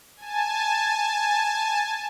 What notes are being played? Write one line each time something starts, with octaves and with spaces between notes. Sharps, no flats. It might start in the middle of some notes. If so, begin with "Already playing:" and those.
G#5 A5